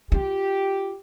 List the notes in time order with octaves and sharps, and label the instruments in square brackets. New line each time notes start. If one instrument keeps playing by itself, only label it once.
[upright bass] F4 [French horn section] G4